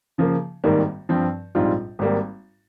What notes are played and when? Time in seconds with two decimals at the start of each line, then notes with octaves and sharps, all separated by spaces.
0.18 C#3 F3 A#3
0.64 G#1 G#2 D#3 G3 A#3
1.09 G2 F3 C4
1.55 A#1 G#2 G3 C4 F4
1.99 G#1 G3 A#3